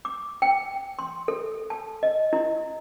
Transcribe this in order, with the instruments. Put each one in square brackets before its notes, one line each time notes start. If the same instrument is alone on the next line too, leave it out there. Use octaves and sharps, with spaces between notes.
[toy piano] D6
G5
C6
A4
A5
D#5
E4